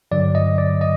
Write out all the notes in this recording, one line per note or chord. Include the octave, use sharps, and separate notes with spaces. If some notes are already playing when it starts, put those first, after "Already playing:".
G2 D3 F#3 D5
D#5
D5
D#5